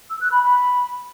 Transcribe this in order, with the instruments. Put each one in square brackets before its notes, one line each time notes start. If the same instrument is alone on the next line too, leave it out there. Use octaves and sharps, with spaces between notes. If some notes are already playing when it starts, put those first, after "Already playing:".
[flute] E6
F#6
B5
B5